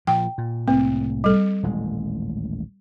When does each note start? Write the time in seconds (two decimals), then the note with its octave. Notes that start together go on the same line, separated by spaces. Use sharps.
0.07 A#2 F3 G5
0.38 A#2
0.68 C2 A2 A#3 C4
1.24 G3 A4
1.63 D#1 A1 G#3